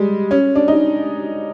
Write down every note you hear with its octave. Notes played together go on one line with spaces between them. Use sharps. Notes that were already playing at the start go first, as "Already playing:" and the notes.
Already playing: G3 G#3
C#4
D4
D#4